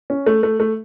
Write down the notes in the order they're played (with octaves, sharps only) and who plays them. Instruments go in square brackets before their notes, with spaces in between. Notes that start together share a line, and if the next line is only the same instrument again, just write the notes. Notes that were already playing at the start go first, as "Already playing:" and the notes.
[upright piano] C#4
A3
A3
A3